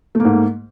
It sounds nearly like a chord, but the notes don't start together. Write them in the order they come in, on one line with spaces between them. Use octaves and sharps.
A3 A#3 G#2